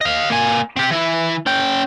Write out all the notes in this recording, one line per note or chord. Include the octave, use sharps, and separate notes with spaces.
D#5 F5
A#3 G#5
C4 G4
E3 E4
C#4 G5